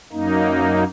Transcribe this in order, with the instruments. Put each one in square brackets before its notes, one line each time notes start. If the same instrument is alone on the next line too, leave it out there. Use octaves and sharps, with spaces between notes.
[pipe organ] F#2 A#3 D#4